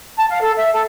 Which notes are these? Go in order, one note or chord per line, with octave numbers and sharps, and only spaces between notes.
A5
F5
A4
E5
A4